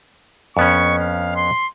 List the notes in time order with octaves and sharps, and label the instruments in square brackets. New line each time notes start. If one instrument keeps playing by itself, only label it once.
[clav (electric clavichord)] F2 B3 C#4 [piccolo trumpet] C#6
[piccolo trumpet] F5
C6